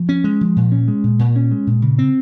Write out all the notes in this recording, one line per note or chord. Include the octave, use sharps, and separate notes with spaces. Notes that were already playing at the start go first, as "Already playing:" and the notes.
Already playing: F3
C#4
G#3
F3
A#2
C#4
G#3
A#2
A#2
C#4
G#3
A#2
C#3
C4